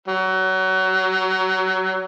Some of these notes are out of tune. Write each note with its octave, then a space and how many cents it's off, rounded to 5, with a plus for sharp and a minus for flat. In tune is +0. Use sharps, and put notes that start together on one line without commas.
F#3 +25